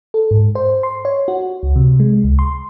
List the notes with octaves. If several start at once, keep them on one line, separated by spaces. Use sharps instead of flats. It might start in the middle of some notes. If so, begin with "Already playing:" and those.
A4
G#2
C5
C6
C#5
F#4
C#2
C3
G#3
C#2
C6